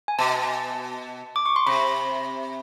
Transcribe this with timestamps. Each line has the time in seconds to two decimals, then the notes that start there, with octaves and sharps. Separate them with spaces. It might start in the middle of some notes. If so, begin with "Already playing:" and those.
0.08 G#5
0.19 B2 A5
1.36 D6
1.46 C#6
1.56 C6
1.66 C3 B5